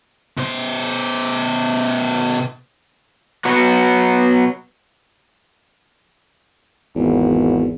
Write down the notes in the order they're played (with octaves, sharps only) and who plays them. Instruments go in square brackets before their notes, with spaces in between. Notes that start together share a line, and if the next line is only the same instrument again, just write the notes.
[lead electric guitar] B2 C5
[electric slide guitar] F#3 B3 F#4
[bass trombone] G#1 [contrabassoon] E2